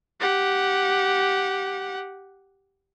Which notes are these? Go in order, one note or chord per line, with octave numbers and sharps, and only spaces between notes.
G4 F#5